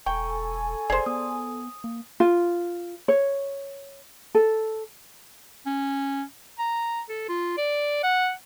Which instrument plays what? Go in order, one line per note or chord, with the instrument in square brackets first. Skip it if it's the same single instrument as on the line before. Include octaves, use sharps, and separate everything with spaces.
[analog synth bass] E1 [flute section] A4 G#5 [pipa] G5 [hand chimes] A#5 C#6
[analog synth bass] F#1 [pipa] G#4 C5 [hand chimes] D5 C6
[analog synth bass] B3 [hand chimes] D#6
[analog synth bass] A#3
[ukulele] F4
C#5
A4
[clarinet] C#4
A#5
A4
F4
D5
F#5